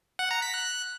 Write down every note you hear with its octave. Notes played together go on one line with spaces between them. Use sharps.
F#5
A#5
B6
F#6